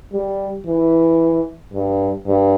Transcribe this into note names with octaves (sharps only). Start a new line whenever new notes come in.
G3
E3
G2
G2